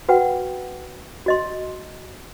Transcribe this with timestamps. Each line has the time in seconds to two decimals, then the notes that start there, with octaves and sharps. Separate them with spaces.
0.09 F#4 B4 F#5 G5
1.26 F#4 D#5 C6